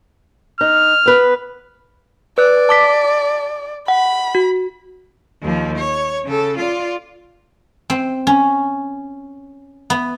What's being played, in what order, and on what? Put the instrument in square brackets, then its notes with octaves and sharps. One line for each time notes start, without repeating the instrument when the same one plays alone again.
[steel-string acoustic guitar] D#4 [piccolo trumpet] F6
[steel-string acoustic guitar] B3 B4
[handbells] B4 F#6 [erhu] D5
[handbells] A5 D6 B6
[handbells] F#5 [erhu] B5
[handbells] F#4
[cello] D#2 F3
C#5
C#3 A4
F4 D5
[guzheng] C4
C#4
B3